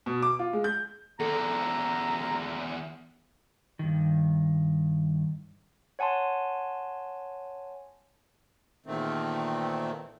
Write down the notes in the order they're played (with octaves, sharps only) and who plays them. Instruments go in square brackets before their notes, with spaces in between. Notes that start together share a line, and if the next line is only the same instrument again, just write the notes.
[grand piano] B2
D6
F4
G#3
G6
[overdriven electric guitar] E2 D3 [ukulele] A4 [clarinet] A#5
[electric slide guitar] G2 D#3
[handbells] C#5 F#5 G#5 A5 C6
[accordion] E2 A#2 D#3 A3 C4